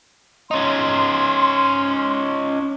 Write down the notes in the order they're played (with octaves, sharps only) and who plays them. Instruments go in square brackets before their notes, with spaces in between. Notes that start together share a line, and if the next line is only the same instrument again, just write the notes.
[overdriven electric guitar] C#4 D#4 [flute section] C6